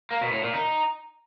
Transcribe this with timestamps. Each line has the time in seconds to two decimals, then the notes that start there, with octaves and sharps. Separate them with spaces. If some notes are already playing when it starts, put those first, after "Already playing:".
0.11 A#3
0.21 B2
0.32 A2
0.43 A#2
0.54 D#4